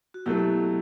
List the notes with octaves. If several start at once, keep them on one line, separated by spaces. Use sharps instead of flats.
F#4
B2 F#3 A3 E4 G4